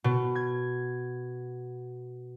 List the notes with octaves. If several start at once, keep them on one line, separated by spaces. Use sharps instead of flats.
B2
G#6